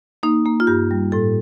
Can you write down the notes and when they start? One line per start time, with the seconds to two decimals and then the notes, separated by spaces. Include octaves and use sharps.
0.23 A#3 D#4
0.46 A#3
0.60 F4
0.67 G2 G4
0.91 G3
1.12 A2 A4